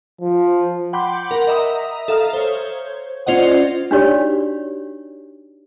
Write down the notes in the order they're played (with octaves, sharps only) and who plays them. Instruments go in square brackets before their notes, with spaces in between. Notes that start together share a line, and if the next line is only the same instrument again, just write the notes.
[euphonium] F3
[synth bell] F#5 G5 B5 C6 D6 G6
A#4 F#5 B5
D#5 E5 A#5 D#6
A4 E5 F5 A#5 D#6 F6
C5 C#5
C#4 F4 C5 D5 D#5 F#5
[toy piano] D4 D#4 F#4 G4 C#5 D5